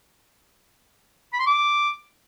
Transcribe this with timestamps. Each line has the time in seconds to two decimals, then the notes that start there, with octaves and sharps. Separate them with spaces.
1.33 B5
1.40 C6
1.46 D6